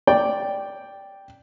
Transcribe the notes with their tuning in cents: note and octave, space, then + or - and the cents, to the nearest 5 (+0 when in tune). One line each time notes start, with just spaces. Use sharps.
D5 +0 G5 +0